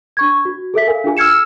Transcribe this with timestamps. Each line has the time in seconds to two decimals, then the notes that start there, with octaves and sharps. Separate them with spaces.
0.17 D4 C#6 G#6
0.45 F#4
0.74 G#4 A4 E5 B6
0.87 A4 A#4 F5 G#5
1.04 D4 F4 G#4 G#5
1.17 E6 F6 G#6 C#7 E7